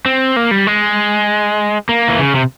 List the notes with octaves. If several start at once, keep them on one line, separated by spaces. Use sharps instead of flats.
C4
A#3
G3
G#3
A#3
E3
C#3
C3